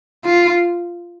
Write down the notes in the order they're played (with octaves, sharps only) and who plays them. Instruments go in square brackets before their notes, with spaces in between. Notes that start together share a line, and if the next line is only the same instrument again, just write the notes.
[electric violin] F4